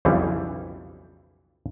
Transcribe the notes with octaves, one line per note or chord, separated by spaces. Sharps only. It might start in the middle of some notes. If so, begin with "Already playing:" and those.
B1 F2 C#3 E3 G3